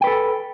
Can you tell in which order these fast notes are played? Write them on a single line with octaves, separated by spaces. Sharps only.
G5 B4 A4